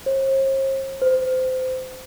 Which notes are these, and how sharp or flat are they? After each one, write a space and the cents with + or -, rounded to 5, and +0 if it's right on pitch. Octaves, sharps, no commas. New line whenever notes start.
C5 +45
C5 -25